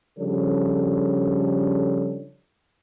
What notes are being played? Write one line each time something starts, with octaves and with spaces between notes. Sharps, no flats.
C#3 F3 G3 D4 A4 C#5